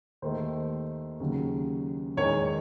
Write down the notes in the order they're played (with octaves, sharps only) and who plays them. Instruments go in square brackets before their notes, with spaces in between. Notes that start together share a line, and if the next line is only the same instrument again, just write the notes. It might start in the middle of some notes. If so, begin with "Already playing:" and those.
[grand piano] D#2 D#3 A3 C5
D#2 C#3 F#3
E2 D#3 G#3 C#5